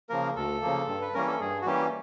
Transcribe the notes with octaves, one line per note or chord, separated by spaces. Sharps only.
C#3 F3 A#3 A#4
D2 A4
C#3 F3 A#3
G2
B4
E3 G3 A#3 C#4 A#4
A4
G2 G#4
F#4
E3 G3 A#3 C#4 G4